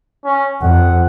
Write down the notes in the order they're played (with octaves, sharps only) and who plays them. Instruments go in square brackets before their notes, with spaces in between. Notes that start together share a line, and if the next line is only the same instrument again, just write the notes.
[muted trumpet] C#4
[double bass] F2 [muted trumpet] F#5